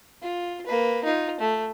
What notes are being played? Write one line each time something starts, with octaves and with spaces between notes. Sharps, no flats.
F4
A#3 B4
D#4 F4
A3